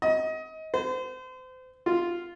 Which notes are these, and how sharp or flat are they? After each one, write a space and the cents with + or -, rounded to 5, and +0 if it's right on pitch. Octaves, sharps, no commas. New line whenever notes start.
D#5 +25
C5 -35
F4 -5